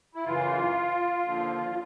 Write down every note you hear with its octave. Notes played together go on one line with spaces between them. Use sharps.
E4
F#2 C#3 E3 F4
D#2 D3 F3
F4